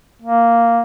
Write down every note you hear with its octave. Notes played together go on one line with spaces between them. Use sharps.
A#3